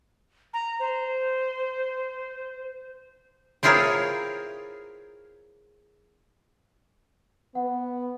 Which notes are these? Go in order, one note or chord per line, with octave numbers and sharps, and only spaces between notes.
A#5
C5
C4 E4 F4 G#4 A#4 C#5
B3 F#5